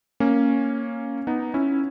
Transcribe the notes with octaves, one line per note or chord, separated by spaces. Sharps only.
A#3 C#4
B3 D#4
C#4 E4